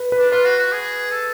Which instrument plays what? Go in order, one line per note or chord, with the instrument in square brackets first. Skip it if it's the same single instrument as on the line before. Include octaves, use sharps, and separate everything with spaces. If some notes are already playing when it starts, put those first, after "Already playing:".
Already playing: [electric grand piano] B4
B4
[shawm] D4
[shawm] F4 [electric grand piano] B4
[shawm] F#4
F#4
G#4
A4